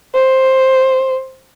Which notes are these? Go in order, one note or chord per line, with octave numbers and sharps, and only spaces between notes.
C5